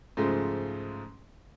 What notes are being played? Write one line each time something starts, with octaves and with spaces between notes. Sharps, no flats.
G#2 C#3 F3 G#3 A3